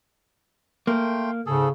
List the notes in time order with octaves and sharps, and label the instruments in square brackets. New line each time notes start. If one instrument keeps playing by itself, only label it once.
[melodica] A3 G5 C6 [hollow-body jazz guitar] A#3
[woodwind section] E2 G#2 C#3 [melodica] G#4 A4